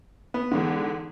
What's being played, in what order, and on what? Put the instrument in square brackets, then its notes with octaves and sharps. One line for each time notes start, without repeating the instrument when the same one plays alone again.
[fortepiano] B3
[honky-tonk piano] E2 G#2 D3